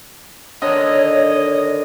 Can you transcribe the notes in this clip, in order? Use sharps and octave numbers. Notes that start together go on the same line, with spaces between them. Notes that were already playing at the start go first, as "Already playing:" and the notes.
D3 D#3 C#5 D#5